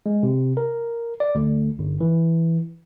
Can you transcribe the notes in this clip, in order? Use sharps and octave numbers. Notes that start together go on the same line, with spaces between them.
G#3
C3
A#4
D5
D2
G1
E3